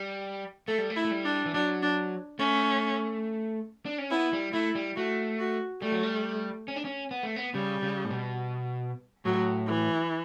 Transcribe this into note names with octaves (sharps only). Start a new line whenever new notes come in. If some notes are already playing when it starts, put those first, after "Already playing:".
Already playing: G3
A3 A4
G3
A3
E4
A3
G3
D4
E3
F#3 D4
D4
A3 C#4
D4
C#4
B3 E4
G3
A3 E4
G3
A3 F#4
F#4
G3 A3
F#3
G3
C#4
D4
C#4
B3
A3
B3
C#3 G3
C#3
A2
B2
A2 F#3
E3